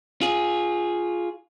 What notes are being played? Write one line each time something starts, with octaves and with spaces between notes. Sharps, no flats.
F4 G#4